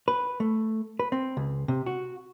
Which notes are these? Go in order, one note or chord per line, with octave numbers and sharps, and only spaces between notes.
B4
A3
B4
C4
C#2
C3
F#4